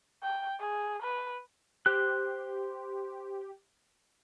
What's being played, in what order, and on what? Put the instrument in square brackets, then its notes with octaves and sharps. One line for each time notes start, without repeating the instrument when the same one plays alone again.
[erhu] G5
G#4
B4
[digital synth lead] G4 [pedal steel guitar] C5 F#6